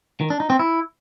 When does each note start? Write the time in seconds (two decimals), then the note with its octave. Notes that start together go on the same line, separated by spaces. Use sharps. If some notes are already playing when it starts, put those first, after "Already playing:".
0.21 D#3
0.30 D4
0.40 D#4
0.50 C4
0.59 E4